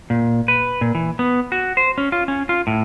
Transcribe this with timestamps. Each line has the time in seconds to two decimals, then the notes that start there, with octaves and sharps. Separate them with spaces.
0.10 A#2
0.48 B4
0.81 A#2
0.95 E3
1.19 B3
1.52 F#4
1.77 C5
1.98 C#4
2.12 F4
2.28 C#4
2.49 F4
2.67 A2